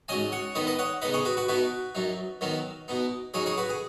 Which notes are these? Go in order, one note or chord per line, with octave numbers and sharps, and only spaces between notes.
G#2 F#3 C#4 D#5 G#5
C#5 F#5
D#3 B3 D#4 B4 D#5
B4 D#5
C#5 F#5
C#3 B3 D#4 B4 D#5
G#4 C#5
F#4 B4
F#4 B4
B2 B3 D#4 F#4 B4
F#2 F#3 D#4
D#3 F#3 B3 D#4
B2 B3 D#4
C#3 F#3 D#4 G#4 C#5
G#4 C#5
F#4 B4
G#4